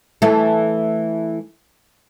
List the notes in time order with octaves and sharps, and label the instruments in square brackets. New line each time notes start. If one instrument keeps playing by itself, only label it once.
[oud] E3 A3